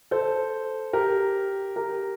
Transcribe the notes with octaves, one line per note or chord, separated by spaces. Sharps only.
A4 C5
G4 A#4
G4 A#4